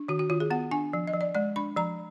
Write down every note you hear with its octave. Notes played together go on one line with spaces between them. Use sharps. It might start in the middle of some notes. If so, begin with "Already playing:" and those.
Already playing: D4
D#3 F#4
F#4
D#3 F4
G#4
B3 F#5
D4 G#5
F3
D#5
F3
D5
G#3 D5
D4 B5
F3 A#5